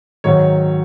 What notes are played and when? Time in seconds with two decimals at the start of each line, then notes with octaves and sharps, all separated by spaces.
0.24 G#2 D#3 F#3 C#5